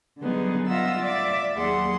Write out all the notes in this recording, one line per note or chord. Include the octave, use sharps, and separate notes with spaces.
D3 F#3 G3 B3 D#4 G#4
F4 D#5 E5 F#5 E6
D5 E5 D6
D#2 F#3 G#4 F#5 C6